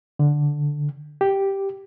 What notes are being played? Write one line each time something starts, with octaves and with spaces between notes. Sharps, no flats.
D3
G4